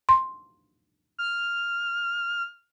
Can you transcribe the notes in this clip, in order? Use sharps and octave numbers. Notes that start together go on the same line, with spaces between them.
C6
F6